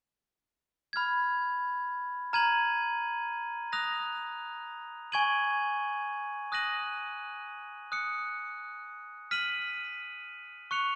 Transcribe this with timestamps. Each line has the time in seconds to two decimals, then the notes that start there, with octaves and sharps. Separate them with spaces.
0.93 B5 F6 G#6
2.33 A#5 F6 G#6 D#7 F#7
3.72 D#6 F#6 A#6 F7
5.12 G#5 C#6 G#6 D#7 F#7
6.52 D#6 F#6 A#6 D#7 F#7
7.92 D#6 F#6 C#7
9.31 F6 B6 D#7 F#7
10.71 C#6 F#6 C#7 F7